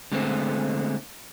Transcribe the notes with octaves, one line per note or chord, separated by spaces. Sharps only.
D3 G#3 A3 B3 C4